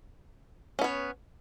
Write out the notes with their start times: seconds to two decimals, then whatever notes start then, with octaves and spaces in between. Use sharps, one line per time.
0.79 C#4
0.81 B3
0.84 C#5